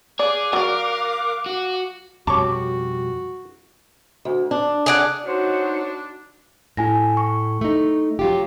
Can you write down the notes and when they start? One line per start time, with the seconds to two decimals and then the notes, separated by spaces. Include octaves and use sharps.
0.19 G#4 D5 F5 D6 F#6
0.53 F#3 A#4 D5
1.46 F#4
2.27 F2 B2 G3 F#4 C#5 A5 C#6 D6
4.25 D2
4.51 D4
4.86 G#4 D5 F#5
5.26 D4 D#4 F#4 C5 C#5 F#5
6.77 A2 E4 G#5 A#6
7.17 C#6
7.61 A3 D#4
8.19 F#3 F4 G4